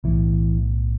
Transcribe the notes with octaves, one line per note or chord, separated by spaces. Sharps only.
B1 A2 E3